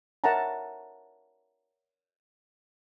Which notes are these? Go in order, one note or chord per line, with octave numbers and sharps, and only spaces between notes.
A#4 C#5 E5 F#5 A5 A#5